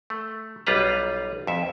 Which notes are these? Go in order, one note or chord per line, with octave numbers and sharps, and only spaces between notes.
A3
B1 G3 F4 B4 A#5
F2 E5